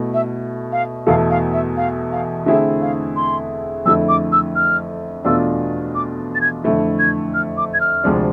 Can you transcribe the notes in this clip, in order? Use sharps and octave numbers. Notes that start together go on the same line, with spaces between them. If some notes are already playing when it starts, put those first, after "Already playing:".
Already playing: B2 A3 E4
E5
F5
E2 B2 A3 E4 A4 F5
F5
E5
F5
F5
D3 A3 C4 E4 G#4 E5
F5
C6
F2 D3 A3 E4 E6
D6
E6
F6
E2 B2 A3 D4 F4 E6
D6
A6
G#6
F2 D3 A3 E4
G#6
F6
D6
G#6
F6
D2 C3 F3 G#3 D4